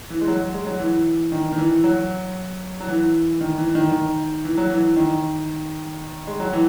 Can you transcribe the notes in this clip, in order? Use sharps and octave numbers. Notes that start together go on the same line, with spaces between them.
E3
G#3
F#3
G#3
F#3
E3
D#3
D#3
E3
F#3
F#3
E3
D#3
E3
D#3
D#3
E3
F#3
E3
D#3
G#3
F#3
E3